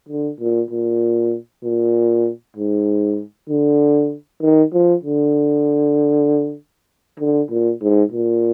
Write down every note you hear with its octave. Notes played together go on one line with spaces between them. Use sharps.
D3
A#2
A#2
A#2
G#2
D3
D#3
F3
D3
D3
A#2
G#2
A#2